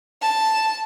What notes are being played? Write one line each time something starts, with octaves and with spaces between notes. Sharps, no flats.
A5